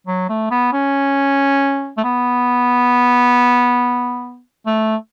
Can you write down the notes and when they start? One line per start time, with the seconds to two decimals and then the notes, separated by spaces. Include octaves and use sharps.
0.07 F#3
0.29 A3
0.51 B3
0.73 C#4
1.98 A3
2.04 B3
4.66 A3